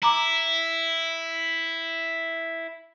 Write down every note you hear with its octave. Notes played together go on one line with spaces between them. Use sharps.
E4 A#5 D6